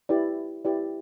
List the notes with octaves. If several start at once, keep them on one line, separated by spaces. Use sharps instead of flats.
E4 G4 B4 D5
E4 G4 B4 D5